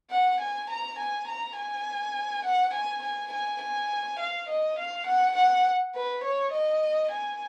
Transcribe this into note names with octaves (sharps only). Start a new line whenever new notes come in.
F#5
G#5
A#5
G#5
A#5
G#5
F#5
G#5
G#5
G#5
G#5
F5
D#5
F5
F#5
F#5
B4
C#5
D#5
G#5